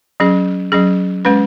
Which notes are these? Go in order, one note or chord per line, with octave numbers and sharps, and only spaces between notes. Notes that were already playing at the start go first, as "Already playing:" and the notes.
F#3 C#4 G#4
F#3 C#4 G#4
G#3 C#4 B4